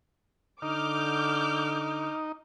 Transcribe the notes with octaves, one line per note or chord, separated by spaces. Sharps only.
D3 D#4 D6 F6 G6